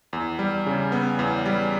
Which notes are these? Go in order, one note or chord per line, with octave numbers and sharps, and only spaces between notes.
E2
G3
C#3
B3
E2
G3